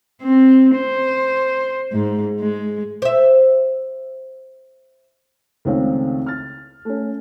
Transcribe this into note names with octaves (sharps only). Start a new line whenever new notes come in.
C4
C5
G#2
G#3
C5 E5
C#2 D#3 A3 C4 C#5 F5
F6 A6
A3 C#4